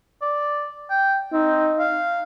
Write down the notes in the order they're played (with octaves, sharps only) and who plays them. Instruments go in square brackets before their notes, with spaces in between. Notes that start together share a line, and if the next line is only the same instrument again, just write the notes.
[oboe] D5
G5
[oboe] C4 [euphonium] D#4
[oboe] F5